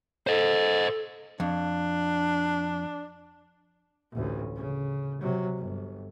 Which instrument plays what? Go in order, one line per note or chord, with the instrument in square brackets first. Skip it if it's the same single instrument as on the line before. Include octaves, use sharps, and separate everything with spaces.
[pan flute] A4 [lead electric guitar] C5 D#5
[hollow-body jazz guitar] F2 [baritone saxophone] D4
[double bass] A1 D2
C#3
C3 F#3
G1